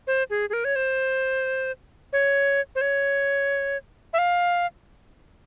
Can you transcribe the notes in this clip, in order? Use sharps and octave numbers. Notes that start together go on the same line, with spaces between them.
C5
G#4
G#4
A#4
C#5
C5
C#5
C5
C#5
E5
F5